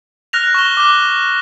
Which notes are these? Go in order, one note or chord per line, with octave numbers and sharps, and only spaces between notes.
F6 F#6 A#6 F7
C#6 E7 G7
D6 F#6